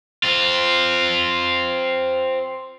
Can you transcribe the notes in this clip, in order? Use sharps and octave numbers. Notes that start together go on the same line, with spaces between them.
C4 F4